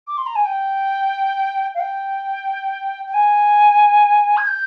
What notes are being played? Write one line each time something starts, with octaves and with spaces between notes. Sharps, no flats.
D6
C6
A#5
G#5
G5
F5
G5
G5
G#5
G#6
G6